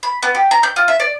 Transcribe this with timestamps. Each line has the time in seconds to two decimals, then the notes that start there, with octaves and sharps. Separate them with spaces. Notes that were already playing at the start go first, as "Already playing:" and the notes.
0.03 B5
0.23 B3
0.35 G4
0.51 A#5
0.63 G6
0.76 F4
0.88 E5
1.00 D5